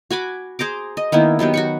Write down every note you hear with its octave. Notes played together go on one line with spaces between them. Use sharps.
F#4 G#5 B5 D6
G#4 C5 A#5 D6
D#5
D#3 A#3 B3 E4
D#3 F#3 B3 G4
F#4 B5 C#6